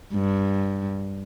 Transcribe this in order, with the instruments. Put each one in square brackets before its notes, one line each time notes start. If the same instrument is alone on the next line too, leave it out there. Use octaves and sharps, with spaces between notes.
[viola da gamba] G2